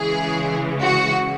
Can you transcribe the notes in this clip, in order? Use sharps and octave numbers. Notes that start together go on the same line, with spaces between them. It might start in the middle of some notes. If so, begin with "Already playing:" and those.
Already playing: C#3 E3 G#3 G#4
F#4